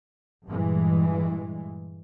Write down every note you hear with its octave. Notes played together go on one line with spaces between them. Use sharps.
G2 A#2 E3 G#3